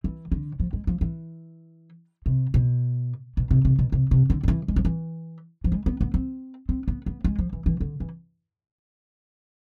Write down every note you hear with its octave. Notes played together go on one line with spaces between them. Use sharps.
E3
D3
F3
G#3
F3
E3
C3
B2
B2
C3
C3
B2
C3
C3
D3
D3
E3
G#3
F3
E3
F3
G#3
B3
B3
C4
C4
B3
B3
G#3
F3
E3
E3
D3
E3